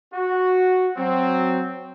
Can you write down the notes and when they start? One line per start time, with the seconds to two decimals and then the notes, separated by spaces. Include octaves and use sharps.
0.13 F#4
0.97 F#3 C4